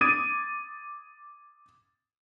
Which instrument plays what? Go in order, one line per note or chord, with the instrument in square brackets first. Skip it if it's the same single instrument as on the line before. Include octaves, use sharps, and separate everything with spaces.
[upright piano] D6 D#6 G#6 A6 D7 D#7